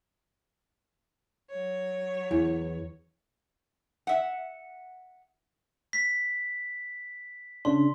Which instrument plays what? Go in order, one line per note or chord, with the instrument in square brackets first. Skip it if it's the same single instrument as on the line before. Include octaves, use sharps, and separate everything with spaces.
[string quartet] F#3 C#5
[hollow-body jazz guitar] E2 [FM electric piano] E3
[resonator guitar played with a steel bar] E5 F#5
[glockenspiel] B6
[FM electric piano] C#3 D4 [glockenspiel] C6